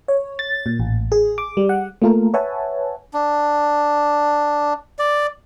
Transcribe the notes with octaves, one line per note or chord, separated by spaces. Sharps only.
C#5
A6
A#2
A1
G#4
D6
G3
F#5
A3 A#3 F4 A4 A#4
B4 C#5 E5 F#5 G#5 A5
D4
D5